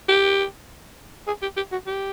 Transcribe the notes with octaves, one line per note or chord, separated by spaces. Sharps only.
G4
G#4
G4
G4
F#4
G4